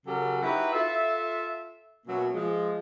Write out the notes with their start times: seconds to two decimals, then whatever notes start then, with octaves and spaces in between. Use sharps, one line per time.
0.06 C#3 F#3 G4 A4 A#4
0.42 D#4 E4 F#4 G4 B4
0.72 F4 A4 E5
2.06 B2 F#3 A#3 C#4 E5
2.33 F3 G#3